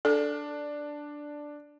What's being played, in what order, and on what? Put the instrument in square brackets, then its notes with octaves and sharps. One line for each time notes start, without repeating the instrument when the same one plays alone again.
[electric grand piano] D4 [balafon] A4